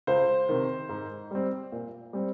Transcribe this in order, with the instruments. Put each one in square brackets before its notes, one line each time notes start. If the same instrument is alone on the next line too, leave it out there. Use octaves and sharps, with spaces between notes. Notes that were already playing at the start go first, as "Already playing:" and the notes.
[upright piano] C#2 C5
C3 D#3
G#2
G3 C4
A#2
G3 C4